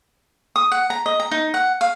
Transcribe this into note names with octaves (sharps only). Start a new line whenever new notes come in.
D#6
F#5
A#5
D#5
A#5
D#4
F#5
F5